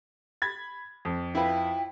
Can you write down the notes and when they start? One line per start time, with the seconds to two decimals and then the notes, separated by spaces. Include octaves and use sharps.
0.42 B5 G#6 A6
1.05 F2
1.35 E4 F4 B4 G5